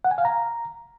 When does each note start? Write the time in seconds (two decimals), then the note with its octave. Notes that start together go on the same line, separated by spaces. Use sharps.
0.05 F#5
0.11 G#5
0.18 F5
0.25 A#5